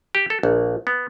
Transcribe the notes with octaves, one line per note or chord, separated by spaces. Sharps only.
G4
A4
A#1
B3